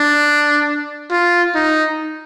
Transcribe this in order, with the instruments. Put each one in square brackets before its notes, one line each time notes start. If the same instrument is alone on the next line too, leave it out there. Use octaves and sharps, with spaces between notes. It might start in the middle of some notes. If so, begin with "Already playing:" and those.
Already playing: [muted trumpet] D4
F4
D#4